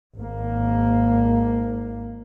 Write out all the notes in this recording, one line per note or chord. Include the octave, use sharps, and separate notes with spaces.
G#1 A#3